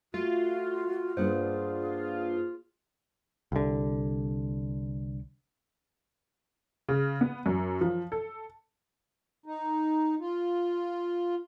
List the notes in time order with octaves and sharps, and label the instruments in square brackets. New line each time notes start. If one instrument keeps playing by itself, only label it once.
[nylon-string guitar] A3 [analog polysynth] F4 [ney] F#4
[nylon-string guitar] G2 D4 F#5 [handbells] A#3 C5 [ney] G#4
[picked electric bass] C2 D3
[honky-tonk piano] C#3
B3
F#2
F3
A4
[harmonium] D#4
F4